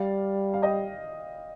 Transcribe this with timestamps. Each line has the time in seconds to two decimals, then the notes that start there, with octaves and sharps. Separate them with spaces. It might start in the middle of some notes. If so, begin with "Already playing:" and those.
Already playing: G3 D5 F5
0.54 F5
0.62 D#5 G5